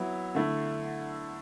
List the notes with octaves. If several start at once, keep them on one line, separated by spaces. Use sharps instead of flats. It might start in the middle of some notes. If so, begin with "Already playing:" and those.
Already playing: F#3 B3 E4
D3 A3 E4